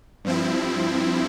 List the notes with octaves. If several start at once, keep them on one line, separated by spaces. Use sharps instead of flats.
G2 F3 C4 E4